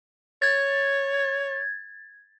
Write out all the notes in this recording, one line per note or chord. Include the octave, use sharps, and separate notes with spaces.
C#5 G#6 A6